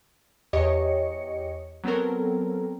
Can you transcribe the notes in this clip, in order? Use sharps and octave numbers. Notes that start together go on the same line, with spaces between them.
E2 G4 C#5 D#5 C#7
F#3 B3 C4 A4 A#4